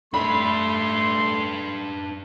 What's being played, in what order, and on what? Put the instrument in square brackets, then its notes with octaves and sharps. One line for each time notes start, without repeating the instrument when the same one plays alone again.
[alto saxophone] A3 [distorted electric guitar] D4 B4 [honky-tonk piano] B5 [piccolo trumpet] C6